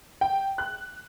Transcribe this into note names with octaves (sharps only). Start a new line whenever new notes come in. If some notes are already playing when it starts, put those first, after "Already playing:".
G5
F#6